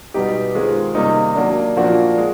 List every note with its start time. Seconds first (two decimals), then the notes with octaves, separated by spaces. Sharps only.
0.14 B2 G3 B3 D#4 G4
0.54 D#3 G#3 C4 F4 G#4
0.95 C3 D#3 G3 A#3 D#4
1.36 F#3 A#3 D4
1.77 A#2 F3 A#3 D4 F#4
2.17 G#3